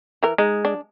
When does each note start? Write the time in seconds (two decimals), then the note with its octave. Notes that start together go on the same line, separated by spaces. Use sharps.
0.23 E3 A#4
0.38 G#3 D#4
0.65 D4